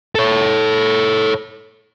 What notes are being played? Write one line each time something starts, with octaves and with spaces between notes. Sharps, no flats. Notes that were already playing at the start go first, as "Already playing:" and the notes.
A4 C#5